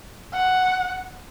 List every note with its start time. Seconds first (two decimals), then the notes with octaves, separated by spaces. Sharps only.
0.34 F#5